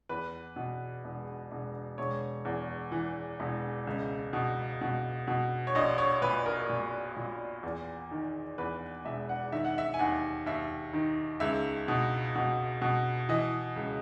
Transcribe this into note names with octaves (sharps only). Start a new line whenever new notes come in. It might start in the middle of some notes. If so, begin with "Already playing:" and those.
E2 B4
B2
E1
E1
E1 C#5
E2
E3
E1
C#2
B2
B2
B2
C#5
A#1 D#5
C#5
A#2 B4
A#4
A#2
A#2
E2
D#3
E2 B4
E1 E5
F#5
D#3 E5
F#5
E5
G#5
D#2 F#5
D#2 E5
D#3
C#2 E5
B2
B2
B2
E3 D#5
C#2